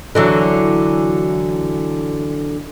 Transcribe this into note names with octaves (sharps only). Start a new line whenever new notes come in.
D3 E3 F#3